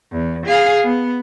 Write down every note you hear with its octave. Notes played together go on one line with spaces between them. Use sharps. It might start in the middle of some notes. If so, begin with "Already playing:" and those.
E2
G#4 F5
B3